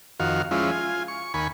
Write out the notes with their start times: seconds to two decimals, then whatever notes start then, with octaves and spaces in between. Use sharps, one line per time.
0.20 F2 D#3 F#4 F5
0.51 F3 G#3 C#4 E4 F4
0.71 F4 G#5
1.08 C#6
1.34 D#2 G#5 B5 C#6